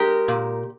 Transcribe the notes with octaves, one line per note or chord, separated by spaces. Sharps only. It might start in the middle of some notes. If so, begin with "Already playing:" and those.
Already playing: G#3 G4 A#4
A#2